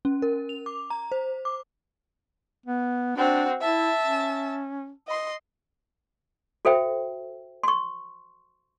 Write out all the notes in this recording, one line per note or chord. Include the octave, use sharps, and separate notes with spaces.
C#4
A#4
F7
D6
A#5
C5
D6
B3
C4 D4 F#4
E4 E5 A5
C#4
D#5 C6
F#4 A4 C5 E5 G5
C6 C#6